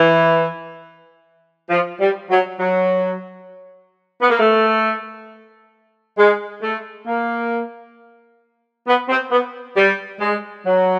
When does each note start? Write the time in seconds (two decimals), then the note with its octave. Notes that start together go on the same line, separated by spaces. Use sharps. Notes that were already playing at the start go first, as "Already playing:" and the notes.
Already playing: E3
1.70 F3
2.01 G3
2.30 F#3
2.60 F#3
4.22 B3
4.30 A#3
4.39 A3
6.18 G#3
6.62 A3
7.07 A#3
8.87 B3
9.09 C4
9.31 B3
9.76 G3
10.20 G#3
10.66 F#3